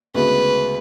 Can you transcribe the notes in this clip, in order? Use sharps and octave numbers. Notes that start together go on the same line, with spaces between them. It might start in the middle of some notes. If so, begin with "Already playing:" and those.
D2 C#3 G#3 B3 F#4 B4